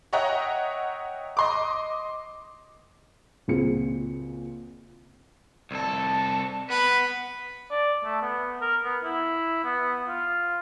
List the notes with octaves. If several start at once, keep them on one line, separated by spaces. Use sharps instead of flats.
C#5 D#5 E5 F#5 G5 A#5
D#5 C6 D6
C#2 A#2 C4 F#4 G#4 C#7
C2 A4
B3 B4
D5
A3
B3
A#4
B3
E4
B3
F4